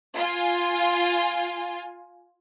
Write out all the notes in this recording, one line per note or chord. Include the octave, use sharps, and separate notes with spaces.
F4 G#5